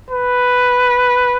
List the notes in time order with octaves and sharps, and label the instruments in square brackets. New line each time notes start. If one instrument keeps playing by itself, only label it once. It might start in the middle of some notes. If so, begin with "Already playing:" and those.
[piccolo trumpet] B4